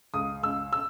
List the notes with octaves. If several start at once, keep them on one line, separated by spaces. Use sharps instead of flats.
C#2 D#6
C#2 E6
E6